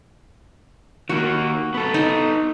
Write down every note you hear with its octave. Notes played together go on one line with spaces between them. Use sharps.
D#3 A#3 F#4
B3 A4
D#4